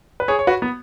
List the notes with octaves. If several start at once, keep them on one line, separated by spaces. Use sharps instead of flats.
B4
G#4 C#5
C#5
F#4 B4
B3